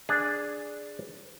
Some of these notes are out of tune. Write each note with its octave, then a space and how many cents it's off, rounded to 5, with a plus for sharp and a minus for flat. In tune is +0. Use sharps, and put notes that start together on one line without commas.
D4 +0 G#4 +0